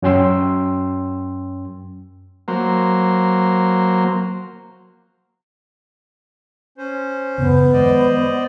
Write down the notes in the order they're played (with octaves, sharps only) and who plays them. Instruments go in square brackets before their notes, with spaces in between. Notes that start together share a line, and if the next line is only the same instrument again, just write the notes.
[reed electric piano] F#2 F#3 C#4 G5 C6 E6
[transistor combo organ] F#3 A#3 C5
[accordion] C#4 C5
[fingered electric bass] F#2 C#3 E3 [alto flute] B3
[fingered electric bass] D#3 F3 G#3 [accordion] C5 D5 D#5